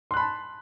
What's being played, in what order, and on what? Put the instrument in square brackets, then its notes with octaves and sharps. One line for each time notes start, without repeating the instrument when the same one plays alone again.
[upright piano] C6
F#6
B5
A5